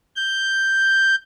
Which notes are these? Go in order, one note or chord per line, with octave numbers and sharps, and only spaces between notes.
G6